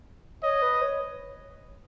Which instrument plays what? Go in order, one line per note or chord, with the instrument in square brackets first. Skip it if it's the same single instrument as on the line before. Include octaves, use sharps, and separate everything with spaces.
[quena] C#5 [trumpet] D#5
[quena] B4
C#5